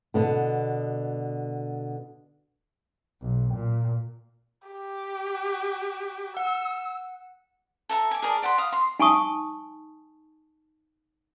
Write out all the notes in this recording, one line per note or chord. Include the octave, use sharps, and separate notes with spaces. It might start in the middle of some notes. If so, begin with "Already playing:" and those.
B2 D3 B3
B1
A#2
G4
F#5 E6
A4 E5 A#5
G#5 D6
G#4 A#4 D5 A5
D5 F#5 B5 C6
F5 D#6
C6
D#4 G#5 A5 C#6 D#6